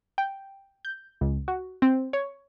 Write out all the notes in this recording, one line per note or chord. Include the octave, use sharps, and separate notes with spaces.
G5
G6
C#2
F#4
C4
C#5